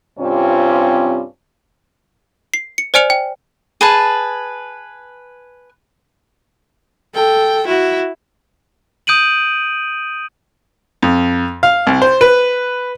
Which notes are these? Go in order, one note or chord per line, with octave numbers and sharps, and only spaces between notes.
G2 C3 C4 C#4 F4
C7
C#7
C5 D5 G#5 F6 C#7 F7
G5
G#4 B4 A5
A4 G5
E4 F#4
D#6 G6 D7 D#7 F#7
F2
F5
C2
C5
B4